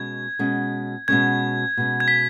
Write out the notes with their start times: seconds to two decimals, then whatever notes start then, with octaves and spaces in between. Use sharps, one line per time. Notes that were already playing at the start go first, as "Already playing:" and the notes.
Already playing: B2 G#3 C#4 G#6
0.39 B2 G#3 C#4
1.08 B2 G#3 C#4 G#6
1.77 B2 G#3 C#4
2.00 G#6
2.08 B6